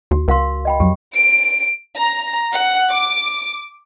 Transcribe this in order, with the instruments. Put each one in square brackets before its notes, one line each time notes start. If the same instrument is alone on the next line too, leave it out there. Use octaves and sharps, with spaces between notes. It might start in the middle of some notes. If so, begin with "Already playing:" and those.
[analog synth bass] D#2 [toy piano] F#4
[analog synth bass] C#2 [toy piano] A#4 F5 C6
[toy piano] D#5 G5 B5
[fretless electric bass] F2 F#3 [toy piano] G4
[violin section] D7
A#5
F#5
D6